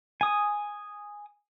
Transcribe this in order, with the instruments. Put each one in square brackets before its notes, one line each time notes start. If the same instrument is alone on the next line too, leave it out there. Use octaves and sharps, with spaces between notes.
[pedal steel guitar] G#5 D#6